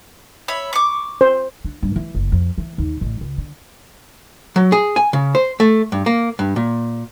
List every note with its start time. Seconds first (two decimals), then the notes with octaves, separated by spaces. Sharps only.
0.48 C#5 E5 B5
0.73 C#6 D6
1.21 C5
1.65 D4
1.83 G2
1.96 E3
2.15 F#1
2.32 F2
2.58 E3
2.78 D#2
3.01 A1
3.21 C#2
3.38 D3
4.56 F#3
4.72 G#4
4.96 G#5
5.13 C#3
5.35 C5
5.60 A3
5.92 G2
6.06 A#3
6.39 G2
6.56 A#2